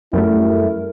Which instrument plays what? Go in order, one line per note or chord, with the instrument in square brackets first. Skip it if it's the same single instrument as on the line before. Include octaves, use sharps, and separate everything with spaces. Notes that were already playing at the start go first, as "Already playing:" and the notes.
[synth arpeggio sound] F#2 G3 A3 [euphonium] E4 [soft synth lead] A#4